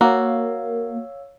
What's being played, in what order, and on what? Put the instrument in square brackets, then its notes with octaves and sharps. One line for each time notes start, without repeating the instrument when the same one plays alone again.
[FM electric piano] A#3 [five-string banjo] F#4 [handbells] C#5 F5 E6